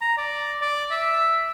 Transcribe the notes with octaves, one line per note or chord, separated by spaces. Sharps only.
A#5
D5
D5
E5